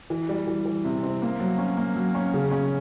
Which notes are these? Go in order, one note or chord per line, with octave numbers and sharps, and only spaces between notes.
E3
G3
E3
E3
C3
C4
A#3
F#3
C#4
A#3
F#3
C#4
C#3
C#4